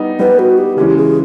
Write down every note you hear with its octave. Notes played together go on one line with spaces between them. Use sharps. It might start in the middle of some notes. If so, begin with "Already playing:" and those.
Already playing: G3 B3 D#4
G3 B3 D#4 B4
F#4
G4
C#3 E3 G#3 C#4 G4
G#4